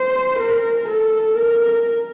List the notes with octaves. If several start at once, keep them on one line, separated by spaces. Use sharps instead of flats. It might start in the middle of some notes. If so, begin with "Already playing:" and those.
Already playing: C5
A#4
A4
A#4